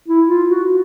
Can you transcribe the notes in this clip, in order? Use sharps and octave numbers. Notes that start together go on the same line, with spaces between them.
E4
F4
F#4